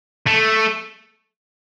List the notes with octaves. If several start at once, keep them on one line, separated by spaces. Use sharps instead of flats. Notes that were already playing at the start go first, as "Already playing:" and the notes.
A3